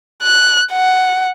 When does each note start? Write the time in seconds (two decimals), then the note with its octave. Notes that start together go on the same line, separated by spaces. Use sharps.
0.23 F#6
0.73 F#5